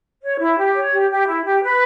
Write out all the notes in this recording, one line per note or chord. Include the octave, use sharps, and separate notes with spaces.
C#5
E4
G4
C#5
G4
G4
E4
G4
B4